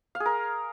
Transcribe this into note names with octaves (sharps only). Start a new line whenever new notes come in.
F5
G#4
A#4